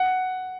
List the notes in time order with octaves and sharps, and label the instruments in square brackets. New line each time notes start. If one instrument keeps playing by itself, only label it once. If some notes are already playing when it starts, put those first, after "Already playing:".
Already playing: [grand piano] F#5